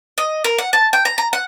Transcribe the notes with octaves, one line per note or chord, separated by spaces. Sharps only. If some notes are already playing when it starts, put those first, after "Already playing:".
D#5
A#4
F#5
A5
G5
A#5
A#5
F#5